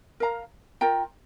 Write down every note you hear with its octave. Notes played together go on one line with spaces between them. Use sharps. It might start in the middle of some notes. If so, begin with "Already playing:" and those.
A#4 F5 A#5
F4 A#4 G5 A#5